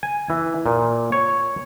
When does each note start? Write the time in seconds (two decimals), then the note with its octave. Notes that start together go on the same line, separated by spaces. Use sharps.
0.03 G#5
0.30 E3
0.66 A#2
1.12 C#5